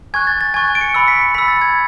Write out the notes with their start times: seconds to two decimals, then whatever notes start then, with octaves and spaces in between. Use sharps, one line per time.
0.14 G#5 C#6 F#6 G#6
0.27 A6
0.41 A6
0.54 G#5 C#6 F#6 G#6
0.68 A6
0.75 D7
0.81 C#7
0.94 B5 E6 C#7
1.08 B6
1.21 C#7
1.34 B5 E6 B6
1.48 A6
1.61 G#6